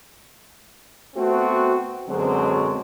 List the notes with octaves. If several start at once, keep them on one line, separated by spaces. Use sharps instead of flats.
A3 B3 C4 F#4
F#2 B2 D3 F#3 G#3 C4